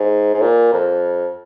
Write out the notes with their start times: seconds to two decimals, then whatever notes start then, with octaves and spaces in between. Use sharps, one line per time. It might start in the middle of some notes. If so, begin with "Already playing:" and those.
Already playing: G#2
0.34 G#2
0.42 A#2
0.73 F2